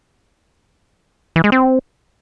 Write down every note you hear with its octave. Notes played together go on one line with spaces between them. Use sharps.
E3
G#3
C4